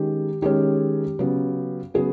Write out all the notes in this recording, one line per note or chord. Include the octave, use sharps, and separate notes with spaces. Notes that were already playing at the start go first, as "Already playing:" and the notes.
Already playing: D#3 G#3 C#4 G4
D#3 G#3 C#4 G4
C#3 F#3 B3
C#3 F#3 B3 G#4